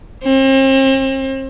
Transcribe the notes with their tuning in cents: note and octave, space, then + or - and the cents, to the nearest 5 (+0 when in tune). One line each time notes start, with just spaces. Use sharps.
C4 +40